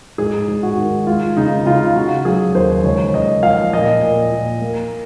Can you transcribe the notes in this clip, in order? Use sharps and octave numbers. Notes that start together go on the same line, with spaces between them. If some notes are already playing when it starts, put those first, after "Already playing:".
G#2 G#4
G#2
F#4
D#3
G#3 F4
C#3 D#4
C#3 F4
C#3 F#4
F#3 G#4
D#2 C5
C#2 C#5
C#2 D#5
F3 F5
A#2 D#5
A#2
A#2
A#3